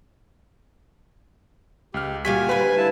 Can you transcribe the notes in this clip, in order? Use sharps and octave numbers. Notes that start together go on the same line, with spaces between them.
C#2 G4 F6
A#2 G3 F#4 G4 F5 G#5 B6
D2 G3 B4 F5
E4 A5